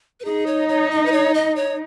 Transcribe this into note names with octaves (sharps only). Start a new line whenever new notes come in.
B4
D#4 G#4
C#5
C#5
D#5
B4
C#5
D#5
C#5